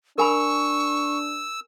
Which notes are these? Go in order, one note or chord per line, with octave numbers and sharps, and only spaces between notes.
D4 A#4 G#5 B5 C#6 E6